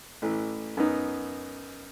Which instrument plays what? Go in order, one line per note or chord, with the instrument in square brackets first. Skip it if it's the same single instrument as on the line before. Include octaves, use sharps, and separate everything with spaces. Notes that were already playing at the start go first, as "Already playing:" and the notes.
[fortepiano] A1 E3
F#2 B3 D#4